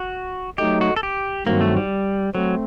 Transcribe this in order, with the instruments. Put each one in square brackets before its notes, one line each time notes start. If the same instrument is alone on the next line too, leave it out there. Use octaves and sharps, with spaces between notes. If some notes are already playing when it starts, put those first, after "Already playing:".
Already playing: [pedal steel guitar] F#4
[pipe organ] F#3 A3 D#4 [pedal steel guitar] G4
[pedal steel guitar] F#4
A4
G4
[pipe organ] G2 D#3 F#3 C4 F#4 [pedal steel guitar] A#3
[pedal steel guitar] A3
G3
[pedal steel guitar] F#3 [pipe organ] A3 C4